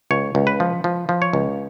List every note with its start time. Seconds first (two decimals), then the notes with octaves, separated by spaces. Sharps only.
0.11 C#2 C#5
0.35 C#2
0.47 B4
0.60 F3
0.84 F3
1.09 F3
1.22 C#5
1.33 C#2